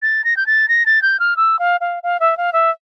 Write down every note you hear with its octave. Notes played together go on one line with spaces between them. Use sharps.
A6
A#6
G6
A6
A#6
A6
G6
F6
E6
F5
F5
F5
E5
F5
E5